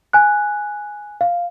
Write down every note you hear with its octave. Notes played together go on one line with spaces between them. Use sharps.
G#5 F#6
F5